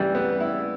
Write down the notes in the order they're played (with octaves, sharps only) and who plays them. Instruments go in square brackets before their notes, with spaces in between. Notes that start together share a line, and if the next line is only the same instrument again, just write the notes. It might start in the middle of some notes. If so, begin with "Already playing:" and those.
Already playing: [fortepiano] C#3 E3 [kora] G3
[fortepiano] B3
E4